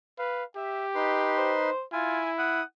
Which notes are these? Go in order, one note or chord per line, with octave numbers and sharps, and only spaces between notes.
B4 F5
G4 E5
D#4 B4 C6
C5
E4 F4 G#5
F#5 D#6